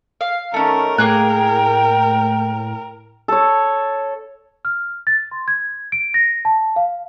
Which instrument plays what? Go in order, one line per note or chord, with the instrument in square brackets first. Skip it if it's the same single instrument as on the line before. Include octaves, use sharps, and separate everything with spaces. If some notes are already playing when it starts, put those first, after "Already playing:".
[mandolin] F5
[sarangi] D#3 [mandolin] A3 C#4 [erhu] A#4 [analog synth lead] A5
[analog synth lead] A2 [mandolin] A#3 G#4 F#6 [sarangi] G5
[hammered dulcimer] A4 C#5
[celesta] F6
A6
C6
G#6
D7
A#6
A5
F5